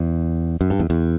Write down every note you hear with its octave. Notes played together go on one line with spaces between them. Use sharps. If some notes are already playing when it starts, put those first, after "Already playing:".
Already playing: E2
F#2
G2
E2
E2